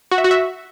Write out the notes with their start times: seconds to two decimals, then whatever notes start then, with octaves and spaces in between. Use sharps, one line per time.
0.11 F#4
0.18 E5
0.24 F#4
0.31 E5